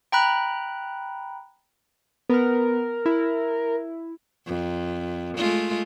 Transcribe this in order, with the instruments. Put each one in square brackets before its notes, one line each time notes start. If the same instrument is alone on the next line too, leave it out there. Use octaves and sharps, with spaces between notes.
[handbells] G5 A#5 B5 F#6
[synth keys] B3 F6 [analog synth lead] A#4
[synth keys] E4
[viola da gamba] F2
G#3 A3 F4